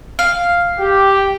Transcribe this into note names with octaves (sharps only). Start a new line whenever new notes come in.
F5
G4